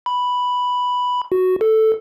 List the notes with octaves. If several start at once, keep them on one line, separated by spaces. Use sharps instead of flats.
B5
F#4
A4